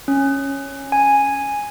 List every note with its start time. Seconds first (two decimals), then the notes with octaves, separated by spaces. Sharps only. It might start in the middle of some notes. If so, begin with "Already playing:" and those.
0.08 C#4
0.92 G#5